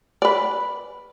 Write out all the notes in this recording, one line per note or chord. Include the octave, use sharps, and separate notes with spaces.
B4 D5